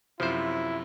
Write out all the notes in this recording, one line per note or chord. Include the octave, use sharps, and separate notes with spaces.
F#2 C3 F3 E4 C5